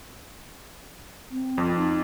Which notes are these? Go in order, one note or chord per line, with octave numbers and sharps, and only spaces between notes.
C4
F2
D#4